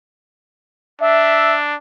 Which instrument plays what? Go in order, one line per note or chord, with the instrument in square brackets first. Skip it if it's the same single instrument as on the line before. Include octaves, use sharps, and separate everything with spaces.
[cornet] D4 [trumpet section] E5